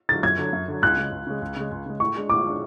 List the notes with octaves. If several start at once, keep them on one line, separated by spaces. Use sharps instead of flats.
D3 F#3 A6
F#2 G#6
D3 F#3
F#2
D3 F#3
C#2 F#6
C#3 G#3
C#2
C#3 G#3
C#2
C#3 G#3
C#2
C#3 G#3
A2 C#6
G#3 D4 G#4
A2 D6
G#3 D4 G#4